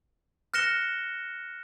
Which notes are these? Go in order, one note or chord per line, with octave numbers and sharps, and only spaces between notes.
F6 F#6 A#6 C#7 E7 G7